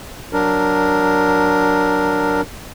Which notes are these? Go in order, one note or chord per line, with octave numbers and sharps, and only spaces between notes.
F#3 D4 A#4